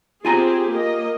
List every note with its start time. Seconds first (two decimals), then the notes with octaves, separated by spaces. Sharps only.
0.25 C4 F4 G4 G#4 G#5 A#5
0.70 A#3 D#5